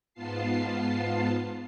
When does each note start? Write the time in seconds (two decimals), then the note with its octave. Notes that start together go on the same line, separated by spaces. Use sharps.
0.14 G#2 B3 F4 A5 C7